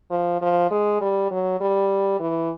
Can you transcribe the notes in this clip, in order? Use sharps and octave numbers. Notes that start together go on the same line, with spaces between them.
F3
F3
G#3
G3
F#3
G3
E3